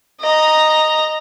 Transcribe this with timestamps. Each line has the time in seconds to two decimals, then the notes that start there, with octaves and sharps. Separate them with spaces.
0.20 D#5 A#5